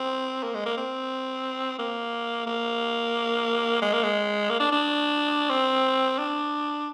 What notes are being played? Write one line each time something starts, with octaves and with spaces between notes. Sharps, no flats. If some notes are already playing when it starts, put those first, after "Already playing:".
Already playing: C4
A#3
G#3
A#3
C4
A#3
A#3
G#3
A#3
G#3
A#3
D4
D4
C4
D4